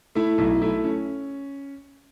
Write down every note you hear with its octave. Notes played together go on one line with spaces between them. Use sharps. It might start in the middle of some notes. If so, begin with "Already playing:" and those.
A3 E4
B1 E4
A3 E4
C#4